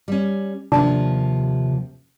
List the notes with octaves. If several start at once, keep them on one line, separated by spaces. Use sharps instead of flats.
G3 C#4
D#2 C3 F3 C#4 D4